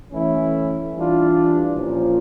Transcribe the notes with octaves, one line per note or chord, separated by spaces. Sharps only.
E3 A3 C#4 E4
E3 G3 D4 F4
A#2 F3 A#3 C#4